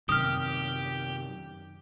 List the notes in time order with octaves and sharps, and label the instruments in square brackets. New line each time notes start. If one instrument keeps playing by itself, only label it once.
[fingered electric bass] F#2 C3 D#3 [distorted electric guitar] G4 [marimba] D#6 F6